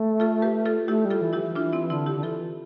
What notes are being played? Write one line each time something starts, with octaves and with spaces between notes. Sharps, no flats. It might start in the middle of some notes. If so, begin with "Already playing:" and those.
Already playing: A3
F4 A4
G4 B4
F4 A4
A3 E4 G4
G3
F4 A4
E3
E4 G4
E3
E3 D4 F4
C4 E4
D3 C4 E4
E4 G4
D3
E3 F4 A4